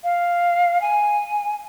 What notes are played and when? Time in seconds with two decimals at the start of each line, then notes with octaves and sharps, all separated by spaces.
0.04 F5
0.81 G#5